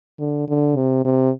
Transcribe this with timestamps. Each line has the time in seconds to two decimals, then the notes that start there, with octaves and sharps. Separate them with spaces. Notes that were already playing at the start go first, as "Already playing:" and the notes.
0.19 D3
0.48 D3
0.76 C3
1.04 C3